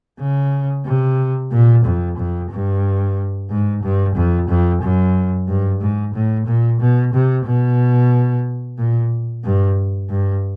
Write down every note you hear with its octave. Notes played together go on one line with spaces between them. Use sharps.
C#3
C3
A#2
F2
F2
G2
G#2
G2
F2
F2
F#2
G2
G#2
A2
A#2
B2
C3
B2
A#2
G2
G2